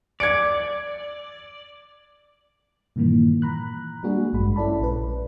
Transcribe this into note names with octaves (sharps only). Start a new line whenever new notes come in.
D5 G#6 C#7 D7
G2 A#2 D#3 E3 A#3
A#5 B5 F#6
G3 G#3 A#3 D4 F#4 G#4
A1 G2 G#3 B5
C#4 E4 A4 D5 A5 B5
A#1 B4